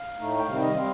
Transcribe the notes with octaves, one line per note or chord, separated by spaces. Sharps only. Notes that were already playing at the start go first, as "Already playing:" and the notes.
Already playing: F5
A2 A3 D#4
G5
C3 D#3 G3 F5
D#5
G3 C4 F5